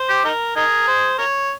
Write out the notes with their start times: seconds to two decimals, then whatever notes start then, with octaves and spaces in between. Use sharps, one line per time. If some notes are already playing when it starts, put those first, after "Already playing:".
Already playing: C5
0.09 G4
0.25 D#4 A#4
0.56 D#4 G#4 A#4
0.87 C5
1.18 A#4 C#5